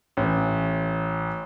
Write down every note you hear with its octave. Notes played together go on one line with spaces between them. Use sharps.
A1